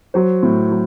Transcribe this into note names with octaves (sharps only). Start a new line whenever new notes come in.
F#3 C5
A2
F#3